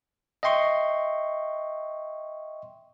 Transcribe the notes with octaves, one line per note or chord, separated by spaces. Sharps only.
D#5 E5 G5 C6 C#6